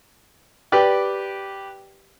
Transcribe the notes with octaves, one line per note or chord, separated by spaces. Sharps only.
G4 B4 D5 G5